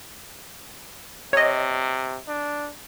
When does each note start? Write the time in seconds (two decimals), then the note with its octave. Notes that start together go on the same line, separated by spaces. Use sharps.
1.33 C3 C#5 D#5
2.28 D4